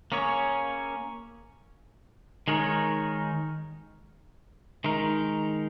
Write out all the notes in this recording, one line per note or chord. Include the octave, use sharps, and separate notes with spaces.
A#3 C#4 G#4 C#5
D#3 G#3 D#4 A#4 C#5
D#3 G#3 D#4 A#4